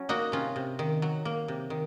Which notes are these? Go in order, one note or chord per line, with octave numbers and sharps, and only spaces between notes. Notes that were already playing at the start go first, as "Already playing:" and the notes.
Already playing: F#3 C#4
A#3 D#4 F#4
C3 C#4 F4
C3
D#3
F#3
A#3
C3
D#3